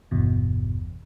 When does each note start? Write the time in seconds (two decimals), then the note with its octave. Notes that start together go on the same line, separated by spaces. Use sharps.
0.11 G1 E2 B2